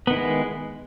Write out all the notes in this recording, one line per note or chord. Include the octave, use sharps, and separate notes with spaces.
D#3 G#3 B3 E4